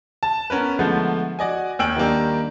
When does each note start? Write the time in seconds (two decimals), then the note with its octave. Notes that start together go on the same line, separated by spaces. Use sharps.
0.23 A5
0.50 B3 C#4 A#4 B4
0.79 D3 F3 G#3 A3 B3
1.39 F#4 D5 D#5 G#5
1.79 D#2 G5 G#5 E6 D7 F#7
1.96 D#3 G3 A#3 D4